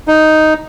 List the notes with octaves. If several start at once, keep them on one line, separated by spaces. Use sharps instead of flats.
D#4